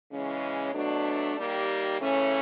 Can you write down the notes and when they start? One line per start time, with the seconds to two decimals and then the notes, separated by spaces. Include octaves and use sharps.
0.12 C#3 E3 G#3 C#4
0.74 B2 F#3 A3 D4
1.36 G3 A#3 D#4 G4
1.99 C#3 E3 A3 C#4